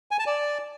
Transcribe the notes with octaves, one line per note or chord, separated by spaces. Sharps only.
G#5
A5
D5